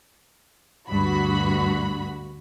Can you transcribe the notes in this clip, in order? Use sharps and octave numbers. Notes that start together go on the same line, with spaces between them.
D2 G2 F#4 B5